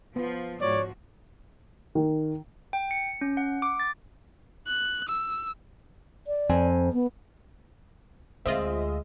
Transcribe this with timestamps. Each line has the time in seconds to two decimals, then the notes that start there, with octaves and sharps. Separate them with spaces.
0.16 F3 B3
0.61 G#2 F3 F#4 C#5 D5
1.95 D#3
2.73 G5
2.91 C#7
3.21 C#4
3.37 F#5
3.62 D6
3.80 A6
4.67 F#6
5.08 E6
6.27 D5
6.49 F2 C4 G#5
6.93 B3
8.46 D2 G#3 C4 F4 D#5 E5